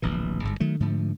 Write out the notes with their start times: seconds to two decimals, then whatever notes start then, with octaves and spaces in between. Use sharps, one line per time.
0.02 D1 A#1 E3
0.42 G1 G#2
0.60 D#3 F#3 A3
0.80 G#2 D3 F3 A3